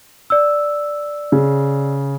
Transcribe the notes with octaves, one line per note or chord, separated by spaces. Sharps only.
D5 E6
C#3